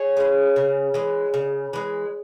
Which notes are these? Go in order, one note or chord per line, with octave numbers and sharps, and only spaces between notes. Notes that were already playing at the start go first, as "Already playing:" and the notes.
Already playing: G#4 C#5
E3 G#3
C#3
E3 G#3
C#3
E3 G#3